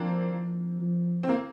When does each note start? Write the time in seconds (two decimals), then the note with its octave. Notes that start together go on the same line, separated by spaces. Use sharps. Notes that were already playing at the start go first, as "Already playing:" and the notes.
Already playing: F3 A#3 C4 D4
0.33 F3
0.81 F3
1.23 C4
1.29 A#3